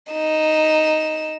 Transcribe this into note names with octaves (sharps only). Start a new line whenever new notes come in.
D#4 E7